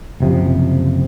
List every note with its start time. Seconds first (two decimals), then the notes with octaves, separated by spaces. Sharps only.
0.20 F#1 C3 F3